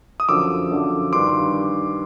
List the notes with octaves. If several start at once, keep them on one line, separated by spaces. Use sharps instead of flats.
D#6
F#2 D3 F3 D6 E6
F#2 D3 F3
G2 D#3 C6 D6